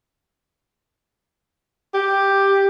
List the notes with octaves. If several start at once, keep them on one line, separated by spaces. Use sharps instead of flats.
G4